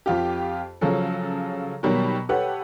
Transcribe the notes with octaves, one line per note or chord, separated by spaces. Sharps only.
F2 F4 G4
C#3 F3 F#3 G#4 A4
B2 D#3 F#3 G3 A#3
G4 A4 B4 C#5 F#5